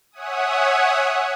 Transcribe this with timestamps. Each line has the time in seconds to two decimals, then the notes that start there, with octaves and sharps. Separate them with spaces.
0.12 C#5 E5 F#5 G#5 D#6